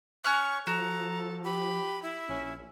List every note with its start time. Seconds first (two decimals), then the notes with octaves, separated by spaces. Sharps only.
0.24 C#4 C#6 F6 F#6
0.67 F3 F#4 A4 A#5
1.45 G4 B5
2.03 E4
2.29 A#1 C#4